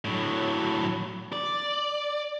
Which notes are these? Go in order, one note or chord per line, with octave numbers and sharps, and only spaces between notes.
A2 F#3
D5